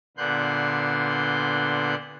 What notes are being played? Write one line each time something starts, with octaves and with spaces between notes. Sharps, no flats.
A#2 D3 B3 C6 F#6 G6